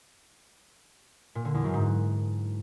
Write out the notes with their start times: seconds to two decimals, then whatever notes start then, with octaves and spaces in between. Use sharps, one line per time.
1.35 A#2
1.45 D3
1.54 E2
1.64 F#2
1.74 G#2